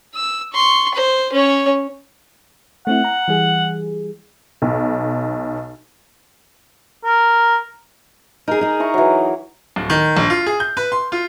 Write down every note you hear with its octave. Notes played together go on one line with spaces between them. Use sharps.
E6
C6 C#6
C5
C#4 C#5
A3 C4 E4 F#5
A#5
E3 G3 G#4
B1
A#4
D#4 G#4 A#4
D#4 G#4
E4 A#5 C#6
E3 F#3
D1
D#3
A#1
F4
G#4
G6
B4
C6
F4